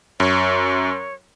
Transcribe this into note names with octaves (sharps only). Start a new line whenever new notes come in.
F#2 C#5